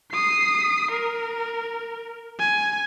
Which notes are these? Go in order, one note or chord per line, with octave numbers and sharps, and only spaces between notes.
D#6 C7
A#4
G#5